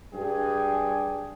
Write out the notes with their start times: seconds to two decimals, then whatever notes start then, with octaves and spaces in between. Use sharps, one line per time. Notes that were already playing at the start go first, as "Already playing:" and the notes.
0.14 G2 G#4 G5